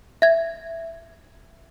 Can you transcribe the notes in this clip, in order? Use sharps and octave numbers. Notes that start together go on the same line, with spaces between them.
E5 G#6